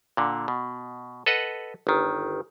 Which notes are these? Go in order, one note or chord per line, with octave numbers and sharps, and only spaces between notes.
A#2 D3
B2
A4 B4 D#5 F#5
G1 D#3